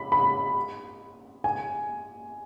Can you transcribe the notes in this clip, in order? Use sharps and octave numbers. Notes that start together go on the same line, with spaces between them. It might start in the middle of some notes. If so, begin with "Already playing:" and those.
Already playing: B5
B5
G#5